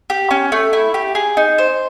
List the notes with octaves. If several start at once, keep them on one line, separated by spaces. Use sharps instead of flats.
G4
C#4
A3
E4
G4
G#4
D#4
C5